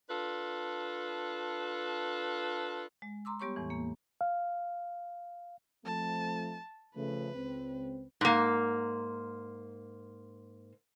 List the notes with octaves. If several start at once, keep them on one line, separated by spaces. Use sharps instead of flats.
D4 F4 A4 B4
G#3
A#5 C6 D6 E6
G3 B3 G4 C#5 C6 C#6
E2 A2 E3
A#3
F5
F3 A3 C4 A5
C#3 F3 A3 B4
C#2 C4
G#2 A#3